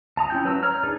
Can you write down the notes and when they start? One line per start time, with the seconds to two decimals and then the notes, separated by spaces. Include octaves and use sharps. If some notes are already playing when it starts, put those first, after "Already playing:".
0.17 A5 A#5 D#6
0.30 C#4 E4 F4 G5 G6
0.45 F#3 B4 A#5 E6
0.63 C#5 A#5 F6
0.83 D4 D#4 G#4 B4 D5